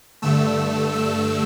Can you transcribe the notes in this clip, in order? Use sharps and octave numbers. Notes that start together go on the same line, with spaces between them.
G2 D3 A3 E6
E6